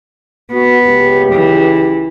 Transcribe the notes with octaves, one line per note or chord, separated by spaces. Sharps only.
B3 F#4
C#2 G4
E3